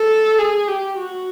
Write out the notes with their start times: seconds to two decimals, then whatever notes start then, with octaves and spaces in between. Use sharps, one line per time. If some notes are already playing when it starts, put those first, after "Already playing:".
Already playing: A4
0.38 G#4
0.68 G4
0.98 F#4